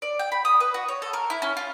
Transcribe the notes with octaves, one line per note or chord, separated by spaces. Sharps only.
D5
G5
B5
D#6
B4
F#4
C#5
A4
A#4
E4
C#4
F4